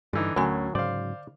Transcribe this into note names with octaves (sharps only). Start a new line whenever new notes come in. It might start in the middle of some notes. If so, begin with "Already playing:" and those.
G2 D3 E3 D#4
D2 A2 D3 F#3 C#4 G#5
G#2 C#3 F#3 C5 D5 F5